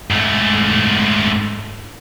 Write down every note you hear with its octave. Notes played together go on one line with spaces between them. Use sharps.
G#2 A3